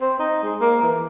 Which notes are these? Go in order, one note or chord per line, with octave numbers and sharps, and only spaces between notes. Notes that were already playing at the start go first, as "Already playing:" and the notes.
C4
D#4
G#3
A#3
E3